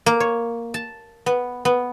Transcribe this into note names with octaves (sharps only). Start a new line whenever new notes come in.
A#3
C#5
A5
B3
B3